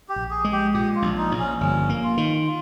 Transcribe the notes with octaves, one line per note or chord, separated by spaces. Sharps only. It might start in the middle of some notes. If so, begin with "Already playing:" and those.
G4
A#1
G#4
G#3
G4
A#2 G4
F4
A#1
D#4
A#1
C#4
G1 C#4
A#3
F4
D#3
F4